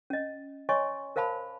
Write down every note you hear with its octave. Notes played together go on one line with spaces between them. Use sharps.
C#4 D#5
C#5 D#5 G#5 C6 C#6
A#4 C5 F5 A5 B5